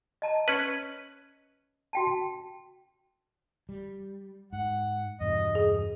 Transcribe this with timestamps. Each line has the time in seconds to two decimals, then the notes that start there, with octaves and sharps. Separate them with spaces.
0.22 D#5 A5 A#5
0.48 C#4 B4
1.93 F#4 G5 A5
3.69 G3
4.53 G#2 F#5
5.21 E2 G2 B2 D#5
5.55 G#4